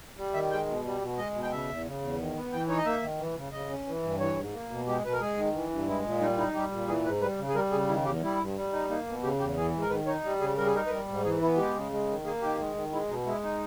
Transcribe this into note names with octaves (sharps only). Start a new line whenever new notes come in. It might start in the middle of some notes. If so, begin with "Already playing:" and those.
G3
D#3 E5
G#3 G5
B2
G3
B2
G#3 D#5
B2
G5
C#3 E5
E2
C#3
E2
D#3
B3
E3 G5
D#4 C#5
D#5
A#3 E5
D#3
E3
C#3
C#3 D#5
C#4
E3
G2
E3 C#5
G#2
A#3
B2
G#3 G4
B2 B4
A#4
G#3 G#4
D#3
E3
G2
G#3 E4
A#2
G3 D#4
D#4 E4
G3 G4
A#2
E3 G#4
G#2 B4
G3 B4
C#3
G#4
G3 A#4
C#3 G#4
D#3 E4
E2 G4
G3 E4
G2
G3
D#4
A#3 D#4
B2
C#3 G4
E2 G4
E3 G#4
G#2
A#4
D#3 B4
D#4 C#5
G3
C#3 G#4
G3 A#4
G#4
D#4 A#4
B4
G3 A#4
G#2
E3 G#4
B3 E4
G#3 G4
C#3
G#3
D#3
A#3 G#4
D#3 G4
G#3
D#3
G#3 E4
B2 D#4
G#3 E4
D#4